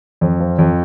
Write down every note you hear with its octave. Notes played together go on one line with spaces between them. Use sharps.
F2
F3
F2